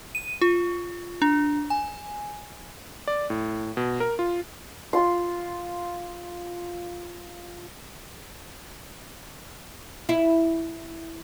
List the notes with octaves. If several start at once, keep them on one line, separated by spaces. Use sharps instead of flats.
D#7
F4
D4
G#5
D5
A2
B2
A#4
F4
F4 C6
E4